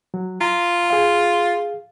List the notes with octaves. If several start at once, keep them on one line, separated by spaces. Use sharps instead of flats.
F#3
F4 A#5
G#4 F5